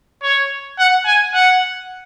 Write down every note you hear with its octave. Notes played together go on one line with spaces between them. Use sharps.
C#5
F#5
G#5
F#5